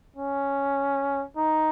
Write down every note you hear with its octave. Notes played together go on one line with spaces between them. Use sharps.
C#4
D#4